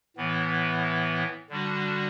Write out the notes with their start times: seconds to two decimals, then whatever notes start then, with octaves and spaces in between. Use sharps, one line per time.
0.17 A2 E3 B3
1.50 D3 G3 D4 F#4